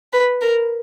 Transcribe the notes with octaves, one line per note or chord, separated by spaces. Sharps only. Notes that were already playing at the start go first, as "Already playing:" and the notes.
B4
A#4